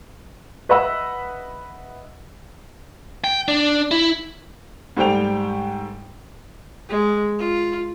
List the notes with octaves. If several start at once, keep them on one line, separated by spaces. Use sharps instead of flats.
B4 D#5 E5 F#5 B5 E6
G5
D4
E4
G#2 G3 A3 C5 G5 F7
G#3
F4